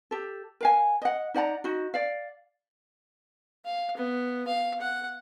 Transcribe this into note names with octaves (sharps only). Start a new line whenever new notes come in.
G4 A4
A#4 F5 G#5
D#5 F#5
D#4 D5 F#5 A#5
D#4 F#4
D5 F5
F5
B3
F5
F#5